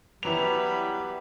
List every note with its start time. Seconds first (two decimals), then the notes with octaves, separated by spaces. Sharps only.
0.23 E3 F#3 G3 B3 B4 F7